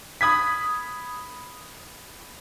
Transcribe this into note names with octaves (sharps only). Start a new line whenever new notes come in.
B5 D#6 G#6 B6